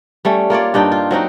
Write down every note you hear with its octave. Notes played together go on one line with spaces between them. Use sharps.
G3 A3 C#4
A#3 F4 C#5 D5
G2 D4 D#4 G5
F4
F#3 C4 D#4 F#4